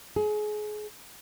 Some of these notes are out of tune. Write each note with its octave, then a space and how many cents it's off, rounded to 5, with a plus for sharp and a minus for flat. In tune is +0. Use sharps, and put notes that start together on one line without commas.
G#4 +30